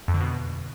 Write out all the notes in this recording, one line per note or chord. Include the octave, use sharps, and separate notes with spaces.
F2
D3
B2